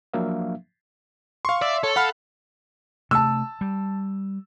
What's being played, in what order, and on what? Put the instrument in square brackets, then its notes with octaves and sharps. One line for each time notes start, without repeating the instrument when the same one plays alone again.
[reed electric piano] F3 F#3 A#3 D4 E5 F5
[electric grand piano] F5 C6 [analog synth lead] C#6
[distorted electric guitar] D5 [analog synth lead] E5
[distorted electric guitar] A4 [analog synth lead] C#5
[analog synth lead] F5 [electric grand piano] F#5 B5 F6
[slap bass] C3 A3 [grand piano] A5 E6
[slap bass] G3